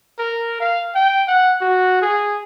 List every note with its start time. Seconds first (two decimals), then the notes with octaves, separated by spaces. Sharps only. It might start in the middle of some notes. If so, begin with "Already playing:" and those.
0.19 A#4
0.60 F5
0.95 G5
1.28 F#5
1.61 F#4
2.02 G#4